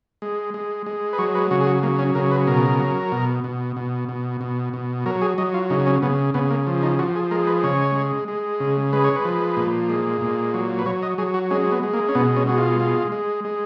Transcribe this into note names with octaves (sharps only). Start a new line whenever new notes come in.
G#3
G#3
G#3
B4
F#3 C#5
B4
C#3 F#4
G#4
F#4
F#3 A#3
C#4
C#3 A#4
B4
B2 A#4
F#3
B2
B2
B2
B2
B2
B2
F#3 A#4
G#4
F#3 D#5
F4
C#3 D#4
C#4
C#3 B3
C#3 B3
A#3
F3
D#4
F3 F#4
G#4
G#3 A#4
B4
C#3 C#5
G#3
G#3
C#3
G#3 B4
C#5
B4
F3
A#2
G#3
A#2
F#3
B4
F#3 C#5
D#5
F#3 G#4
F#4
G#3 C#4
B3
G#3
A#3
C#4
B2 B3
C#4
G#3 F#4
F4
G#3
G#3
G#3